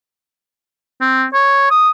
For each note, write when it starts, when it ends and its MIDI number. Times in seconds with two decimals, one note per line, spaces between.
1.01 1.25 60
1.34 1.68 73
1.71 1.90 87